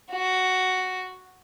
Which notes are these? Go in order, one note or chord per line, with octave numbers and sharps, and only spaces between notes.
F#4